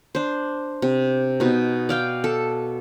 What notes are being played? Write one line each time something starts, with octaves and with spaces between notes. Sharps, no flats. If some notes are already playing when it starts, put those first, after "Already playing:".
D4 C5
C3
B2 D#4
D5 F5 G5
A4